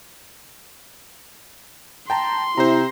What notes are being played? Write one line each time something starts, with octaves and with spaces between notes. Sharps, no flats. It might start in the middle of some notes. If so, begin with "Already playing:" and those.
G5 A5 A#5 C6
C3 E4 C5 A#5